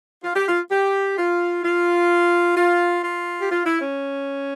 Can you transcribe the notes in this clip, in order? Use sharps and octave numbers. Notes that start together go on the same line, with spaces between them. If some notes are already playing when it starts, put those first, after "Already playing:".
F4
G4
F4
G4
F4
F4
F4
F4
G4
F4
E4
C#4